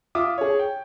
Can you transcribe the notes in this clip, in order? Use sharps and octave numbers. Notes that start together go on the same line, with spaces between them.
F4 E5 D6 D#6
G#4 C#5
G5